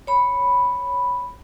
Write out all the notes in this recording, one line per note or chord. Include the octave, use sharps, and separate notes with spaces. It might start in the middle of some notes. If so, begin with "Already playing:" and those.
C#5 B5